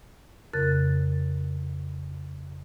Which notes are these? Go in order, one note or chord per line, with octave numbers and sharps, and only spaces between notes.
F2 C#3 A#4 F#6 A6